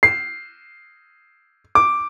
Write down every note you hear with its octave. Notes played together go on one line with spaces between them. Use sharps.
C7
D6